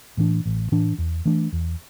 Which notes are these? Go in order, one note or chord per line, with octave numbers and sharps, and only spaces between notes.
A2 E3 D4
A1
A2 E3 D4
E2
E3 A3 D4
E2